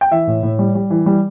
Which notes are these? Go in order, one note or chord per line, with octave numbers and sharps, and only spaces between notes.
G5
E3 E5
A2
A2
G3
G3
E3
G3